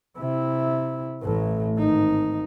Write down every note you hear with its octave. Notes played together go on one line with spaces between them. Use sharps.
C3 E4
A1 A2
G#1 D#4